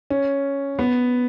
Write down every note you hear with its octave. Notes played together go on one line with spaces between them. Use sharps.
C#4
B3